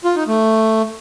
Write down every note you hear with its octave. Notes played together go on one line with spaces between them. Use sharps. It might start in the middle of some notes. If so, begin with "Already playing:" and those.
F4
D#4
A3